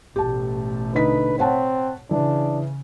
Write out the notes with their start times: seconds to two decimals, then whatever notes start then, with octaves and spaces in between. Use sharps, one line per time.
0.16 A1 B2 A3 G4 A5
0.95 D3 D#4 B4 B6
1.39 C4 C#5 F#5 A5
2.11 C#3 E3 D4